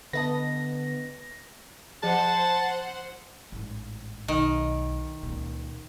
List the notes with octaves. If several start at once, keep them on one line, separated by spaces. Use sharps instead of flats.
D3 B3 B4 D#5 A5 A#6
F3 G#4 C5 F#5 A5
A1 G#2
B1 D#3
C#2 A#2